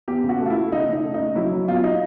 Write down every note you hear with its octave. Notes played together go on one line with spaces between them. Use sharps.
E2 G4
C#3
F#4
A3
F4
E4
A3
C#3 D#4
C#3 D#4
A3
D#4
C#3
F#3 E4
F#3
E2 F4
D#4